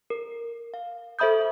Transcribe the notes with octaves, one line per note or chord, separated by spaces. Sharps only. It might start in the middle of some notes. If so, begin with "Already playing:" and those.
A#4
F5
A4 C5 E5 B5 D#6 G6